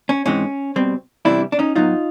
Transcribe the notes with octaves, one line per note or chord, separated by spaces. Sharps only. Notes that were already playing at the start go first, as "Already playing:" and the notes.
C#4
G#2 E3 G#3 C4 C#4
B2 G3 C4
E2 C3 E3 G3 D4 E4
D4
C#4 D#4
A2 F#3 B3 D#4 F4